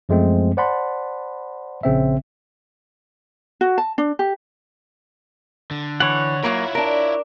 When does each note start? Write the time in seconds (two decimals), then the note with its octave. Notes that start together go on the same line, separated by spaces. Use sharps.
0.09 F#2 F3 G#3 A3 C4
0.57 C5 D5 F#5 A5 B5 C6
1.83 A#1 C#3 C4 E5
3.61 F#4
3.78 A5
3.98 D4
4.19 G4
5.71 D3
6.00 E3 C#5 F#5
6.43 F#3 A#3 E4 F4 A#4
6.75 D4 A#4